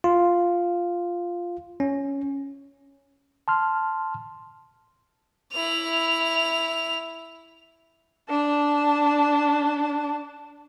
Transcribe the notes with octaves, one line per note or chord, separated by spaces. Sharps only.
F4
C#4
A5 C6 F6
E4 F7
D4 A5